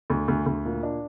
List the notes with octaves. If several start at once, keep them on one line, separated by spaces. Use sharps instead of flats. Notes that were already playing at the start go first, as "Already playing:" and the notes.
D2
D2
D2
A#2
D4